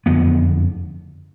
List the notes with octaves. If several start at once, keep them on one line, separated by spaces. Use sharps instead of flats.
F#1 F2 D3 B3